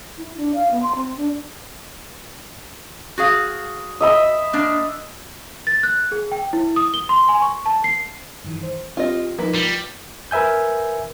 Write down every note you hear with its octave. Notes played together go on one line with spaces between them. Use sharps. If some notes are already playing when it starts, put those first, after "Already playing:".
E4
D4
F5
B3
C6
C4
D4
F#4 G#4 F5
D#5 E5 B5
A#3 D4
A6
F#6
G#4
G5
E4
D#6
G7
C6
G#5
C#6
A5
C7
G2 D#3 E3
C5
C4 F4 G4 D#5
F3 A#3 D#4 B4
G3 F4
A#4 B4 E5 G#5 G6